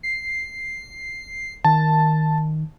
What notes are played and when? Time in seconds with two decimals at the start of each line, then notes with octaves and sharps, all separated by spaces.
0.03 C7
1.65 D#3 A5